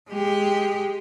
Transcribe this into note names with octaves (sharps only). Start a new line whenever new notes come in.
G#3 G4